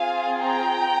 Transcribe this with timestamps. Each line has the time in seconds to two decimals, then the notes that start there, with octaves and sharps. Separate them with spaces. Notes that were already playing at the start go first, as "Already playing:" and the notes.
Already playing: C4 F4 G#4 F5 G#5
0.41 G5 A#5